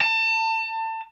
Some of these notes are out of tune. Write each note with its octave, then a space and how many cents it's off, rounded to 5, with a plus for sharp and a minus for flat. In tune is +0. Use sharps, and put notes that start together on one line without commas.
A5 +30